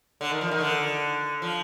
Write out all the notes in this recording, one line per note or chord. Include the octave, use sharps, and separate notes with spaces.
D3
D#3
F3
D#3
D3
F3